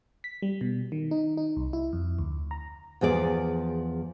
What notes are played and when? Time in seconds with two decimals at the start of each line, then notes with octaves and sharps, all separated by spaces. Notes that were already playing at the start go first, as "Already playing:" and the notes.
0.24 B6
0.42 G3
0.61 B2
0.92 D#3
1.11 D#4
1.37 D#4
1.57 C2
1.73 E4
1.93 F2
2.19 D2
2.51 A#5
3.01 E2 F3 G#4 D5